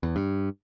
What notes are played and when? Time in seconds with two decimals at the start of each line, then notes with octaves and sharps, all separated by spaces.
0.03 E2
0.16 G2